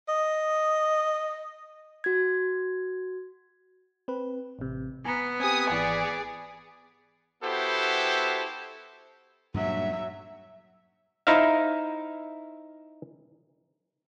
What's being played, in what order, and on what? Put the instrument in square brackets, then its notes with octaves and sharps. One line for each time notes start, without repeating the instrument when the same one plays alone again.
[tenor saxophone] D#5
[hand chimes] F#4 G#6
[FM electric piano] C4 B4
A1 C3
[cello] B3 [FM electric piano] G#5 A#5
[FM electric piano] C4 G4 [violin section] G#5 D#6
[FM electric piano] G#1 E3 [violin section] G#4 D5
[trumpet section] B3 E4 F#4 G4 A4 C5
[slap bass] G2 A#2 D4 [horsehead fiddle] F#3 E5
[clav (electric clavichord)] D#4 E4 C5 E5 F5